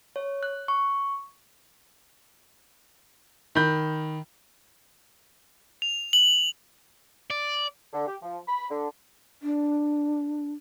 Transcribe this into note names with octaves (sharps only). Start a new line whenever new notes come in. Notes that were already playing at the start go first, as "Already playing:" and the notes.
C#5
F#6
C#6
D#3 B5 G6
F7
F#7
D5
D3
G4
F3
B5
D3
D4